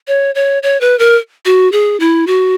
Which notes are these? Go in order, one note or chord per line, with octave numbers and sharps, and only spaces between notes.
C#5
C#5
C#5
B4
A#4
F#4
G#4
E4
F#4